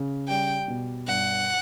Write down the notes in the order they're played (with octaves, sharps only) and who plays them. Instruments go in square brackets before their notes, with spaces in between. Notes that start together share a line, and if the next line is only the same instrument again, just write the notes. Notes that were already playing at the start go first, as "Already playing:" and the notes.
Already playing: [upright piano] C#3
[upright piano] G3 [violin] G5
[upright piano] B2
[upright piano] G2 [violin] F#5